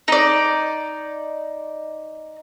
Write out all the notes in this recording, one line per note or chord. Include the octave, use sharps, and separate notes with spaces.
D#4 D5